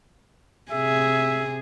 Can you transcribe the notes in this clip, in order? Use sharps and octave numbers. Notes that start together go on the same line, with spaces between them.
C3 G#4 E5